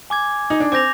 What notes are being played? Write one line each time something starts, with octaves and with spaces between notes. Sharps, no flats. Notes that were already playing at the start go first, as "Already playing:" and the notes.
G#5 D6 G#6
D#4
D4
C4 D6 G6 A#6 F7